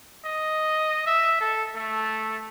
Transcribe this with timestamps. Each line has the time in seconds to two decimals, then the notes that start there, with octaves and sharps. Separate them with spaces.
0.25 D#5
1.07 E5
1.41 A4
1.76 A3